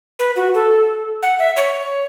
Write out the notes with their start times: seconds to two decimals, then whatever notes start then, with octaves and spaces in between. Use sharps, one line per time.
0.19 B4
0.36 F#4
0.55 A4
1.23 F#5
1.39 E5
1.57 C#5